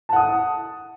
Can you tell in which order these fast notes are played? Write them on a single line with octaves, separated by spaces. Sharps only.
A5 F#5 D#6